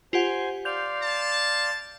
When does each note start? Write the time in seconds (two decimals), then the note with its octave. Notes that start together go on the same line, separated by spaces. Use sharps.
0.13 F4 G4 C5 F#5 G#5
0.65 D5 F5 C6 G6 F7
1.01 A5